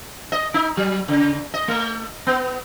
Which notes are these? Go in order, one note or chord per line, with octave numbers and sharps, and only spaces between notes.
D#5
D#4
F#3
C#3
D#5
A3
B3